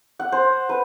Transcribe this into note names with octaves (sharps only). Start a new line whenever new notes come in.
F#5
C5
B4